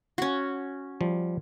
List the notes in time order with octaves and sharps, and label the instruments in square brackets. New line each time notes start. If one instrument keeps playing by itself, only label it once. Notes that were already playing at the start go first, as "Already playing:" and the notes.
[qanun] C#4 F#4
[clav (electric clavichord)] F3 G3